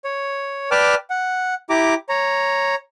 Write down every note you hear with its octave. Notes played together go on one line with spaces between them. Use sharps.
C#5
B4 D5 G5 A5 D6 F6
F#5
E4 G4 A#5 D6
C#5 A#5